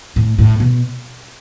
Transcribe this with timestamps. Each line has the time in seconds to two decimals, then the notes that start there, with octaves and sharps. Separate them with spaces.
0.16 A2
0.38 A2
0.60 B2